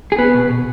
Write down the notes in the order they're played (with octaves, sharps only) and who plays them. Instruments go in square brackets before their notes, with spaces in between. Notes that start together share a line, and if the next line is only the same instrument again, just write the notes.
[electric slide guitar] G#4
B3 B4
B2
B2